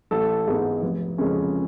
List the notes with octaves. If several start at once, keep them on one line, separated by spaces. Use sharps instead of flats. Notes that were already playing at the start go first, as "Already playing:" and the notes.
A1 A4
G#2 G#3 B3
F1
F2 C#3 G#3 C#4